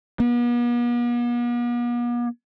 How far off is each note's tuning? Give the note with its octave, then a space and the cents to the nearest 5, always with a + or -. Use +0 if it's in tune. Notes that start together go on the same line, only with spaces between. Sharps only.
B3 -45